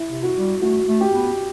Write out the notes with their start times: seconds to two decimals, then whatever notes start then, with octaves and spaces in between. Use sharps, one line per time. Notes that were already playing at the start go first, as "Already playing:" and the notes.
Already playing: E4
0.09 C3
0.23 F#4
0.36 G3
0.61 A3 F#4
0.88 A3
1.01 G4
1.13 B3